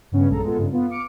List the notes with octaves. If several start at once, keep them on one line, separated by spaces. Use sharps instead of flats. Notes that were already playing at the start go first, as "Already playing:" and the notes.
G2 C#3 B3 C#4
A#1 F#2 G#3 A4 A#5
G#3 B3 F4 A4
G2 C#3
B3 F4
D6 F6 C#7 D7